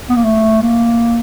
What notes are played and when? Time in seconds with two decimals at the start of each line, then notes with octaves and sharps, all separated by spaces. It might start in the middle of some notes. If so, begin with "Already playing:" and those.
0.09 B3
0.16 A#3
0.24 A3
0.62 A#3